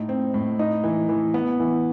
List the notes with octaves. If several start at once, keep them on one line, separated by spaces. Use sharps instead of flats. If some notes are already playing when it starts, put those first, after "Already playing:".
Already playing: A2 D#4
C4
A2
D#4
E3
E3
B3
E3